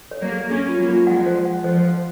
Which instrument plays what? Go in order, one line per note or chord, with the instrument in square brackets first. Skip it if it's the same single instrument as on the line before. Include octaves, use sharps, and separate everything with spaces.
[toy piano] C#5
[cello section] F#3 A#3
[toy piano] G#4
[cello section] A#3 C#4 [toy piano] G#4
[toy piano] F4
[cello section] F#3 A#3
[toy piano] F4
[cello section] F3 G#3 [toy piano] F#5
[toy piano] C5
F#5
[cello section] F3 [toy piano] C5
[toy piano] C5